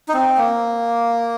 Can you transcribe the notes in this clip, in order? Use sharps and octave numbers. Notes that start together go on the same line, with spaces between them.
D#4
C4
A#3